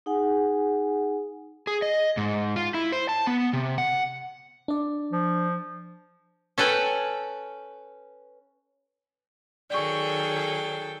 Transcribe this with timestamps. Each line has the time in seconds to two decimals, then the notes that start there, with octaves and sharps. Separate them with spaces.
0.06 D#4 G#4 F#5 G#5
1.67 G#4
1.82 D#5
2.17 G#2
2.56 F4
2.74 E4
2.92 C5
3.09 A5
3.27 B3
3.53 C3
3.78 F#5
4.68 D4 D5
5.12 F3
6.58 C#4 A4 B4 G5
9.70 D#3 F#3 G#4 A4 D5 G5 C#6